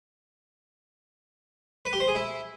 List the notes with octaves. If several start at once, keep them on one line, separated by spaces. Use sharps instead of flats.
B4
G4
C5
G#4
E4